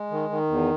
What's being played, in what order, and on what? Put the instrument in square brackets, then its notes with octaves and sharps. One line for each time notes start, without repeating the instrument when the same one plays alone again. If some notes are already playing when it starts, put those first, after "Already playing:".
Already playing: [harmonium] G#3
D#3
D#3
E2